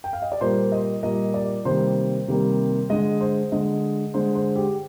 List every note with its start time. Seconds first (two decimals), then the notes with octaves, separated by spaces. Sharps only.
0.04 G5
0.13 F5
0.22 D#5
0.32 D5
0.41 A#2 G3 A#3 C5
0.72 D#5
1.03 A#2 G3 A#3 D#5
1.34 D5
1.65 C3 D#3 G3 A#3 C5
2.28 C3 D#3 G3 A#3
2.90 D3 G#3 D#5
3.20 C5
3.52 D3 G#3 D#5
4.14 D3 G#3 C5
4.35 C5
4.56 G4